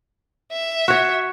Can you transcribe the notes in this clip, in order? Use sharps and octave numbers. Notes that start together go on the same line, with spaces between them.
E5
F#4 C#5